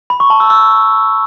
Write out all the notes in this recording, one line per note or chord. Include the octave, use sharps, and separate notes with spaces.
B5
C#6
A5
E6
E6